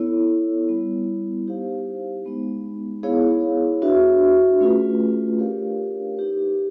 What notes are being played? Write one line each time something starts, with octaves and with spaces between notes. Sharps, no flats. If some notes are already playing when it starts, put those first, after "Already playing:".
Already playing: B3 E4 A4 C#5
G3 B3 E4
D#4 G4 C5 F5
G#3 B3 D#4
B3 E4 G#4 C#5 F5
D4 F#4 B4 E5
A3 C#4 F4 G#4 B4
D4 G4 A#4 C#5 F5
D#4 G4 B4